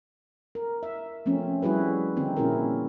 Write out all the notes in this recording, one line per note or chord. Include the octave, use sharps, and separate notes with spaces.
A#4
E5
F3 A3 C4 C#4
G3 E4 F#4 G#4 B4
D3 D#3 C4 D#4
A#2 C#4 E4 F#4 G#4 A#4